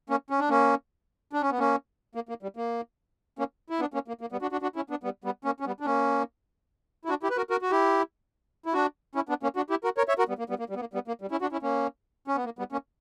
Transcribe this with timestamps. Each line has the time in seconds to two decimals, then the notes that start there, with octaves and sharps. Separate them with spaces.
0.10 A#3 C#4
0.30 C#4
0.40 D4
0.50 A#3 C#4
1.33 D4
1.42 C#4
1.51 B3
1.59 A#3 C#4
2.15 A#3
2.29 A#3
2.43 G3
2.56 A#3
3.39 A#3 C#4
3.70 E4
3.80 B3 D4
3.94 A#3 C#4
4.08 A#3
4.21 A#3
4.32 G3 B3
4.42 D4 F#4
4.52 D4 F#4
4.62 D4 F#4
4.76 C#4 E4
4.90 B3 D4
5.03 G3 B3
5.24 G3 B3
5.45 A#3 C#4
5.60 C#4
5.66 G3 B3
5.80 D4
5.86 A#3 C#4
7.05 E4
7.09 D4 F#4
7.23 E4 G4
7.30 B4
7.37 F#4 A#4
7.50 F#4 A#4
7.62 F#4
7.71 E4 G4
8.66 E4
8.74 D4 F#4
9.15 C#4 E4
9.29 B3 D4
9.43 A#3 C#4
9.56 D4 F#4
9.70 E4 G4
9.84 F#4 A#4
9.98 A#4 C#5
10.08 C#5 E5
10.18 F#4 A#4
10.28 G3 B3
10.39 A#3
10.49 G3 B3
10.59 A#3
10.70 G3
10.76 B3
10.80 A#3
10.93 G3 B3
11.08 A#3
11.22 G3
11.31 C#4 E4
11.41 D4 F#4
11.52 C#4 E4
11.62 A#3 C#4
12.28 C#4
12.36 B3
12.45 A#3
12.59 G3 B3
12.72 A#3 C#4